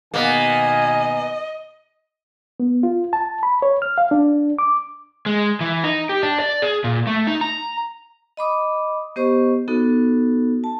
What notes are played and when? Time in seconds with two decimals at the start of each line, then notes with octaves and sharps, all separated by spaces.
0.14 B2 D#3 A#3 B3 D#5 G#5
2.60 B3
2.83 F4
3.13 A5
3.43 B5
3.62 C#5
3.82 F6
3.98 F5
4.11 D4
4.59 D6
5.26 G#3
5.61 E3
5.84 D#4
6.09 G4
6.23 D4
6.40 D5
6.62 G#4
6.84 A#2
7.07 A3
7.27 D#4
7.41 A#5
8.37 D#5 B5 D6 D#6
9.16 B3 G4 C5 D#5 C#6
9.68 B3 D#4 F#4 A4
10.64 A5